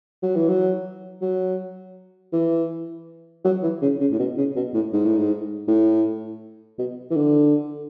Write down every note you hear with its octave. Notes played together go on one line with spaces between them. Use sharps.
F#3
E3
F#3
F#3
E3
F#3
E3
C#3
C#3
A2
B2
C#3
B2
A2
G#2
A2
G#2
A2
B2
E3
D3